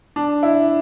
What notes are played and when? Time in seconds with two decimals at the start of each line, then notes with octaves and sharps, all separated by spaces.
0.16 D4
0.43 E4